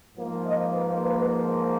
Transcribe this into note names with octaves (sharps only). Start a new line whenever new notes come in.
G#2 F3 A#3
D#5
B4
B4